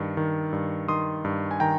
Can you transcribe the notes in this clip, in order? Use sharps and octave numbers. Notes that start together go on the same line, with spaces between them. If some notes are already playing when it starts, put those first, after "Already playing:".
Already playing: G2 D#3
D#3
G2
D#3 C6 D#6
G2
G#5
D#3 G5 A#5